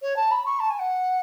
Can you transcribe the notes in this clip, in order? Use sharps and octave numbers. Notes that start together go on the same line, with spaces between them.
C#5
A5
B5
C#6
A5
G#5
F#5